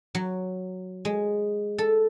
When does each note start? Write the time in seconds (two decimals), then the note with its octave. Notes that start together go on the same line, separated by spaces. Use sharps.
0.15 F#3
1.05 G#3
1.78 A4